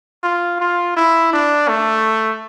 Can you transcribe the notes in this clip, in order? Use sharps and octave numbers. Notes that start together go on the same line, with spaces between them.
F4
F4
E4
D4
A3